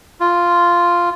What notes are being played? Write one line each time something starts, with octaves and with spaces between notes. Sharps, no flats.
F4